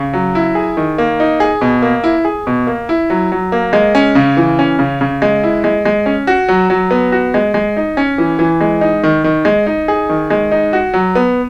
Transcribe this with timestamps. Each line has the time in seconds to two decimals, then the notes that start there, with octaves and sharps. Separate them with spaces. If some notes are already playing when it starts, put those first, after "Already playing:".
Already playing: C#3
0.13 F#3
0.35 E4
0.55 G#4
0.77 D#3
0.98 A#3
1.20 D#4
1.40 G#4
1.61 B2
1.82 A#3
2.04 E4
2.25 G#4
2.47 B2
2.67 A#3
2.89 E4
3.10 F#3
3.32 F#3
3.52 A#3
3.73 G#3
3.95 C#4
4.15 C#3
4.37 E3
4.59 C#4
4.79 C#3
5.01 C#3
5.22 G#3
5.44 E4
5.64 G#3
5.85 G#3
6.06 C#4
6.27 F#4
6.49 F#3
6.70 F#3
6.91 B3
7.12 F#4
7.34 G#3
7.54 G#3
7.77 D#4
7.97 C#4
8.18 E3
8.39 E3
8.61 G#3
8.81 D#4
9.03 D#3
9.24 D#3
9.45 G#3
9.67 D#4
9.88 G#4
10.09 D#3
10.30 G#3
10.51 D#4
10.73 F#4
10.94 F#3
11.15 B3